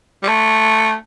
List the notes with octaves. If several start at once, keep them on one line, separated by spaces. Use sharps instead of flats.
G3
A3